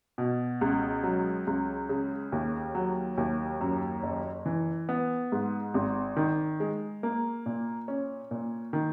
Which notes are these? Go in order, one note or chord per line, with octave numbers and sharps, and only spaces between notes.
B2
C#2
F#3
C#2
C#3
D#2
F#3
D#2
F#2
F#1
E3
B3
G#2
G#1
D#3
G#3
A#3
A#2
C#4
A#2
D#3